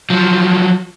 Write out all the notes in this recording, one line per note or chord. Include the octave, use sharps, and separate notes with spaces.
F3 F#3